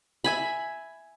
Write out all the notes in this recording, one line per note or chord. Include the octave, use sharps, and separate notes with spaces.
E5 G#5 B5